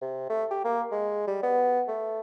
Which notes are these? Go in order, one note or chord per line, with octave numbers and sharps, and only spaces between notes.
C3
A3
G4
A#3
G#3
G3
B3
A3